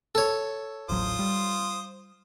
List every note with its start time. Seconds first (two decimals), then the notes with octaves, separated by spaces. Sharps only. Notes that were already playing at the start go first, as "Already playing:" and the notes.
0.15 A4 C#5
0.89 D#1 A1 F#3 F4 C5 D#6
1.19 G3